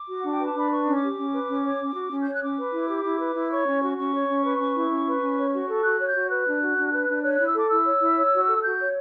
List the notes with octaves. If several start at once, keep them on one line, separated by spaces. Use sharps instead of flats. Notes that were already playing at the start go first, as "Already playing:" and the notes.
Already playing: D6
F#4
D4 F#5
G5
B4
A5
D4 B5
B4 C#6
C#4
D6
G4
C#4
B4
C#4
C#5
C#4
F#4
C#4
C#5 G6
F#6
C#4 D6
B4
E4
G4
E4
B4
E4
C#5 C#6
C#4
F#4
C#4 C#6
C#5
C#4
B4
C#4
E4
C#4
B4
C#4
C#5
F#4
A4
F#4 F#6
C#5
G6
F#4
B4 F#6
D4
F#4
D4
B4
D4
C#5 F#6
E4 F#6
E6
A4 D6
E4 E6
C#5
E4
C#5
F#4
A4
F#4 G6
C#5